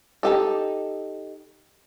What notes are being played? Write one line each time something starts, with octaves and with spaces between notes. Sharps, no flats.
D#4 G4 A4